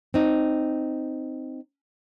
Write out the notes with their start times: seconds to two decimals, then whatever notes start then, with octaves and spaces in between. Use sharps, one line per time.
0.14 C4 D#4